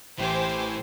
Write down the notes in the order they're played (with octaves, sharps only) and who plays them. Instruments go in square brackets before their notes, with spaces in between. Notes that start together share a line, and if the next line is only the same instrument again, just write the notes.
[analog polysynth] A1 E3 G#5 [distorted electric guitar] A2 [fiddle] G4 D6 [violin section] C5